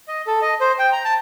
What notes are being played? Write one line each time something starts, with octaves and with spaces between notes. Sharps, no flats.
D#5
A4
D#5
C5
G5
A#5
A5